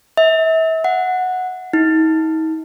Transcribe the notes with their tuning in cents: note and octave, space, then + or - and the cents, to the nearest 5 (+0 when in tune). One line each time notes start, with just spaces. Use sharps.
E5 -35
F#5 -10
D#4 +40